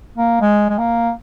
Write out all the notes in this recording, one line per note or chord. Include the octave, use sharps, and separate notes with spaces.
A#3
G#3
G#3
A#3